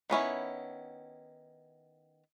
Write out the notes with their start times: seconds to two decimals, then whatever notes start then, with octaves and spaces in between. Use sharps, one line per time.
0.10 D#3 B3 C#4 E4